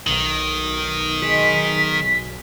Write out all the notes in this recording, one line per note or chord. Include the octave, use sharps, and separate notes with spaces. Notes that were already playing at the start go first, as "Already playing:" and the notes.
B1 D#3
G#3 B6